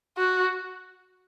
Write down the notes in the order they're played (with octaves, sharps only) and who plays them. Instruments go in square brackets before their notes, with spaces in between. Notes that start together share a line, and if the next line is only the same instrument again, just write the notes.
[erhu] F#4